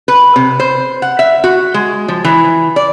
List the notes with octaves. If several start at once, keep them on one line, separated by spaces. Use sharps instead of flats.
B4
C3
C5
F#5
E5
F#4
G#3
F3
E3
D5